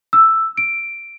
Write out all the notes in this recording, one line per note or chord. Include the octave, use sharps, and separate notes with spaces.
E6
D7